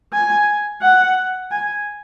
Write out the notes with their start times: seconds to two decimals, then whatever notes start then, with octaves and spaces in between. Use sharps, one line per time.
0.13 G#5
0.82 F#5
1.51 G#5